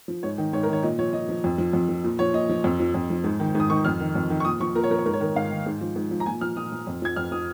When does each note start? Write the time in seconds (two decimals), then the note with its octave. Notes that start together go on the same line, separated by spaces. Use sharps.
0.08 F3
0.23 G#2 C#5
0.38 D#3
0.53 G#2 C#5
0.63 A#4
0.68 D#3 C#5
0.83 A#2 D#5
0.99 F3 C#5
1.13 A#2 D#5
1.29 F3
1.44 F2
1.58 F3
1.73 F2
1.89 F3
2.04 A#2
2.19 F3 C#5
2.34 A#2 D#5
2.49 F3
2.64 F2
2.80 F3
2.94 F2
3.10 F3
3.24 G#2
3.40 D#3
3.55 G#2
3.60 D#6
3.70 D#3 C#6
3.85 F2 F6
4.00 D#3
4.15 F2
4.30 D#3
4.40 C#6
4.45 A#2 D#6
4.60 F3 C#6
4.75 A#2 A#4
4.84 C#5
4.91 F3 A#4
4.98 C#5
5.06 G#2 A#4
5.13 C#5
5.20 D#3 A#4
5.36 G#2 F5
5.51 D#3
5.66 G#2
5.81 F3
5.96 G#2
6.11 F3
6.20 A#5
6.26 A#2 G#5
6.41 F3 F6
6.57 A#2 D#6
6.72 F3
6.87 F2
7.02 F3 G#6
7.16 F2 F6
7.32 F3 D#6